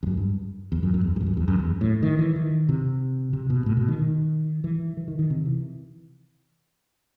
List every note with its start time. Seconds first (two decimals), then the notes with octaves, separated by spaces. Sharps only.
0.03 E2
0.07 F#2
0.17 G2
0.72 E2
0.83 F#2
0.94 F#2
1.05 E2
1.16 F#2
1.21 G2
1.26 F#2
1.37 E2
1.48 F#2
1.59 E2
1.81 A2
2.03 D#3
2.19 E3
2.36 D#3
2.69 C3
3.33 C3
3.50 B2
3.66 A2
3.77 B2
3.88 D#3
3.99 D#3
4.64 E3
4.97 E3
5.08 D#3
5.19 D#3
5.30 C3
5.45 E3